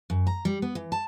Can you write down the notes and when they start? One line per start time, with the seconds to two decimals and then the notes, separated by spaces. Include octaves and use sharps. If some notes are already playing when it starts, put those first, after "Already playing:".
0.10 F#2
0.27 A#5
0.45 G3
0.62 B3
0.75 E3
0.92 A5